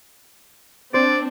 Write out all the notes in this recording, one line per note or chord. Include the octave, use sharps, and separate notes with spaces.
C4 D4 C5 D5